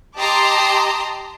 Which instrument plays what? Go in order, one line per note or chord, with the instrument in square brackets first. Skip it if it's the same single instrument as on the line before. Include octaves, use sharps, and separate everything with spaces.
[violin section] G4 D#5 A5 A#5 C6 D6